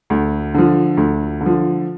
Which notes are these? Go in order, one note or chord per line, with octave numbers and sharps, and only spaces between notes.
D2
D3 F3
D2
D3
F3